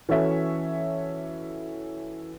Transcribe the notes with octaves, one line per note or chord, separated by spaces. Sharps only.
E3 C#4 F#4 A4 C#5 E5